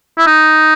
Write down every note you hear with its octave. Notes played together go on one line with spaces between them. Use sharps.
E4
D#4